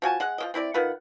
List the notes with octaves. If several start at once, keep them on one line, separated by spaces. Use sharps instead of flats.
F3 F#4 G#5 A5
G#3 F#5
F3 A#3 D#5
C4 E4 B4 D5
D#3 F4 B4 F#5